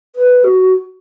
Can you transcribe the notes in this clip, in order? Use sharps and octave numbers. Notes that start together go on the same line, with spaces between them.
B4
F#4